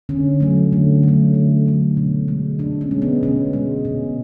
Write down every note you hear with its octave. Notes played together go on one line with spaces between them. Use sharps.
D3 C#4
F#3 A3
D3
F#3 A3
D3
F#3 A3
B2
G#3
B2 D4
C#4
G#3
B3
B2 C#4
G#3
B2